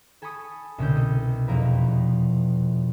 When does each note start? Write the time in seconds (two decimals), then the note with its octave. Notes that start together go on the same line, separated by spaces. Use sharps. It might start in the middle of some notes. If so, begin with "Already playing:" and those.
0.22 A4 G#5 A5 B5 C#6 D#6
0.78 C2 B2 D3 C#4 G6
0.95 A4 D#5
1.48 F1 E2 B2 F3 A#4 B4